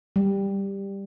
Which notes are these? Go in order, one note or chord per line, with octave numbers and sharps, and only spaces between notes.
G3